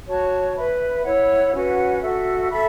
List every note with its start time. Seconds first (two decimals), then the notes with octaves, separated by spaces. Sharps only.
0.08 F#4 C#5 A5 C#6
0.56 B4 E5 B5
1.05 E4 C#5 F#5
1.54 C#4 F#4 B4 F#5
2.03 F#4 A4 E5
2.50 A4 E5 B5